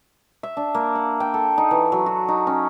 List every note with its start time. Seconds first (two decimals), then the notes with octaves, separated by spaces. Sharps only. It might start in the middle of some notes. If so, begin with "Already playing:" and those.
0.43 E5
0.57 D4
0.75 A#3
0.95 F#5
1.20 G5
1.34 A4
1.58 D#4
1.71 E3
1.92 F#3
2.06 F#4
2.28 D#4
2.47 C#4